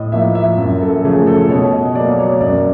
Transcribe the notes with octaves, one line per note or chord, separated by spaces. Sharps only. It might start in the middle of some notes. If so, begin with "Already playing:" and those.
Already playing: A2 D#5
F3 A#3 E5
E5
F#2
A4
C#3 F3 A3 G#4
A4
B2 C#5
D#5
F#3 A#3 D5
C#5
F#2 D5